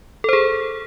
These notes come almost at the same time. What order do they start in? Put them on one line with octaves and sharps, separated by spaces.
A4 C5 G#4